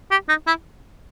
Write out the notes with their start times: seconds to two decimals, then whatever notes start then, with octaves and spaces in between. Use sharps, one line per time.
0.11 G4
0.29 D#4
0.47 E4